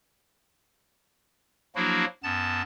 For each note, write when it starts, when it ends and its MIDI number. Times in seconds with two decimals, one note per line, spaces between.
1.76 2.05 53
1.76 2.05 54
1.76 2.05 58
1.76 2.05 62
1.76 2.05 64
1.76 2.05 66
2.23 2.62 42
2.23 2.62 59
2.23 2.62 81
2.23 2.62 93